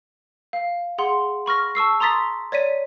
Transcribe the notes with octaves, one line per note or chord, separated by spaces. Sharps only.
F5
G#4 F#5 C6
B5 C#6 F6 A#6
A5 C#6 E6 C7
A#5 C6 D#6 A6 B6
C#5 D5 B6 D#7